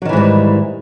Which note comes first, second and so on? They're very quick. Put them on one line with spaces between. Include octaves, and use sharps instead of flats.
F#3 D#3 E3 G#2 G3